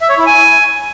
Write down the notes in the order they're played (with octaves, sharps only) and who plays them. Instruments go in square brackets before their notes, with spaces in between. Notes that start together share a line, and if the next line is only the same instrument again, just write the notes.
[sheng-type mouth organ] E5
C#5
E4
G#5